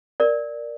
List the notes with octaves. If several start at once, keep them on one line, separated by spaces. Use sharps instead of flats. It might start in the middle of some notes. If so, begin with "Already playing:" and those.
A#4 D5